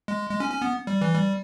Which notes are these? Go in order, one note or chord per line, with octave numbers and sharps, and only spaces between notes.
G#3
G#3
C#4
C#4
B3
G3
E3
G3